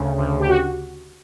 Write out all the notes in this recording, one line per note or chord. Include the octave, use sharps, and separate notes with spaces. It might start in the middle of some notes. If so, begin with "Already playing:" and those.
Already playing: D2 C#3
D2
G4
F#4